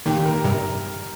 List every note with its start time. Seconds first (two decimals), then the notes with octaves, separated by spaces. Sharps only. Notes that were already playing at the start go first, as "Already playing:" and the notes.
0.06 A#2 D#3 G4
0.25 A#4
0.44 G2 C3 A#4